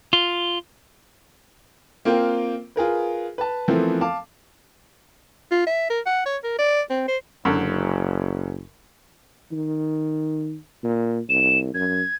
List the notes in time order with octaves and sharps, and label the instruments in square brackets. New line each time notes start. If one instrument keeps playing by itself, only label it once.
[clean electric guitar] F4
[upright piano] A#3 C4 F4 A#4 F5 G5
F4 G#4 A#4 B4
B4 A5
E3 F3 A3 B3 C4 A#4
F5 A5 D6
[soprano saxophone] F4
E5
A#4
F#5
C#5
A#4
D5
C4
C5
[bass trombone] F#1 [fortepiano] F#2 D3
[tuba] D#3
A#2
[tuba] C2 [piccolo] E7
[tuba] F#2 [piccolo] G#6